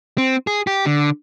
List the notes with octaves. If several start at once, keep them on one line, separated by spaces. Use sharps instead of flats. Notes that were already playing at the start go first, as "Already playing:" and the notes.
C4
G#4
G4
D3